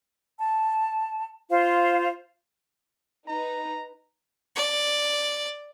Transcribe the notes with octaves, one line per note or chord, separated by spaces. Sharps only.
A5
F4 C5 F5
D#4 B4 A#5
D5